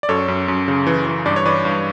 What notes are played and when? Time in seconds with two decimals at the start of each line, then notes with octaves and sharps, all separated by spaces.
0.03 D5
0.09 F#2 A4 C#5
0.28 F#2
0.48 F#2
0.68 C#3
0.87 E3
1.06 E3
1.26 G2 D5
1.36 C#5
1.45 E3 B4 D5
1.65 G2